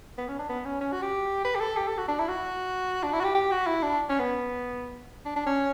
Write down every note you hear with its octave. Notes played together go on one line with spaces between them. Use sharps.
B3
C#4
D4
B3
C#4
C#4
F#4
G4
B4
G4
A4
G4
A4
F#4
D4
E4
F#4
D4
E4
F#4
G4
G4
F#4
E4
D4
C#4
B3
D4
D4
C#4